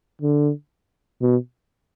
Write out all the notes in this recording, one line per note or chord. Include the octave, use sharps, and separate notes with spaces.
D3
B2